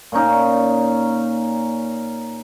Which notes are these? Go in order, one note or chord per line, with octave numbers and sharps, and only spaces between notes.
A#2 C#4 D#4